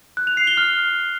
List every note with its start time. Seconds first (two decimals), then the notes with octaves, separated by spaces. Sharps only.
0.17 F#6
0.27 F7
0.37 C7
0.47 G7
0.57 F6